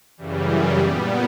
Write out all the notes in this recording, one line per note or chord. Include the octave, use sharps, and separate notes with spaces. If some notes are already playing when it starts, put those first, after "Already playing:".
F#2 C#3 E3 G3
A#2 G3 B3 G#4